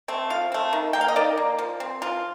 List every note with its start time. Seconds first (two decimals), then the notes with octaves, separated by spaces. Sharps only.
0.08 A3 C4
0.30 F3 F5
0.52 A3 C4
0.73 D#3
0.93 A#3 G5
1.01 F5
1.08 D#5
1.16 D#3 D5
1.37 A#3
1.58 F3
1.80 C4
2.02 F3 F4